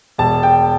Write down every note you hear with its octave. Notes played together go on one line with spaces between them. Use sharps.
E1 A5
G5